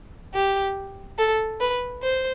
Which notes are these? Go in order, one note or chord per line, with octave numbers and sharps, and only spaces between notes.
G4
A4
B4
C5